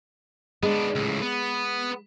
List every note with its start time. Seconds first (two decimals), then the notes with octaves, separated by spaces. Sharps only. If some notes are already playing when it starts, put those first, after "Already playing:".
0.63 G#3 B3 D4
0.96 C#2 A2
1.22 B3